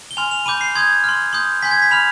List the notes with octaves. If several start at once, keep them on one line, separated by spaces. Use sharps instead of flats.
G7
G#5 C6 F6 F7
F7
B5 D6 G6 D#7
C7
C6 D#6 G6 G#6
C6 F6
C6 D#6 G6
G#5 C6 G6 B6
G#6
B6
B5 F6 F7